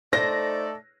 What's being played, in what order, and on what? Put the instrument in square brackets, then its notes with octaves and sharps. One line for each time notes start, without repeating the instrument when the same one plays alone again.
[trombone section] A3 D#4 A4 [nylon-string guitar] C5 [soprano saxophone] D5 [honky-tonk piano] A#6